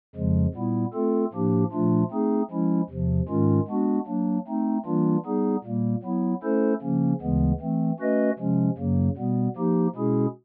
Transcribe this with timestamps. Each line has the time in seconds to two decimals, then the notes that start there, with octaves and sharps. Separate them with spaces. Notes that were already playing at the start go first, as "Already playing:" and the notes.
0.15 F2 C#3 F3 G#3
0.54 A#2 G3 B3 E4
0.93 A3 C4 F4 A4
1.33 A2 F3 A#3 D4 G4
1.72 A#2 F3 A3 D4 F4
2.11 A3 C4 D#4 G#4
2.50 F3 G#3 C#4 E4
2.89 E2 C3 F3
3.29 G#2 D#3 G#3 C#4 F4
3.68 G#3 B3 D4 F#4
4.07 F#3 A#3 D4
4.47 A3 C4 D#4
4.86 E3 G3 A#3 D4 F4
5.25 G3 B3 D#4 G#4
5.64 A#2 G3 A#3
6.03 F#3 B3 E4
6.43 A3 C#4 E4 A4 C5
6.82 C#3 F3 A#3 C#4
7.21 D2 C#3 E3 G#3 B3
7.61 E3 A3 C4
7.99 A3 C#4 F#4 B4 D#5
8.39 C3 F3 G#3 C#4
8.78 F#2 C#3 F#3 A#3
9.17 B2 G3 B3
9.56 F3 A#3 D#4 G4
9.95 B2 G#3 C#4 E4 G#4